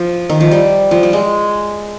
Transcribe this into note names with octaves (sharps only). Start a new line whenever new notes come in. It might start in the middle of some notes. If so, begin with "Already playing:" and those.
Already playing: F3
D#3
F3
G3
F3
G3
G#3